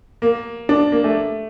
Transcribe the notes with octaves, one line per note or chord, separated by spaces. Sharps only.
A#3
D4
A#3
A3